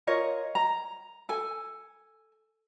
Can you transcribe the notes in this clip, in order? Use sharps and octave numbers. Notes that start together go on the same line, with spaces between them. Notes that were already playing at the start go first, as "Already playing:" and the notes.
F4 A#4 C#5 D#5
A#5
A4 G#5